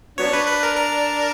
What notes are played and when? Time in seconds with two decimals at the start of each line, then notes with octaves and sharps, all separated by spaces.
0.18 F#3 B3 D4 C#5
0.33 B4
0.47 B4
0.63 A#4
0.77 A#4